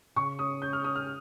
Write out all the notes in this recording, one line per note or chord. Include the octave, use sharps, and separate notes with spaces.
C#3 C#6
C#4 D#6
C#4 G6
F6
C#4 D#6
F6